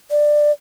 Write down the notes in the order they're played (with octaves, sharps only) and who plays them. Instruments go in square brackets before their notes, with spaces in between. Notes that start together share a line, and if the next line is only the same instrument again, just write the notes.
[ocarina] D5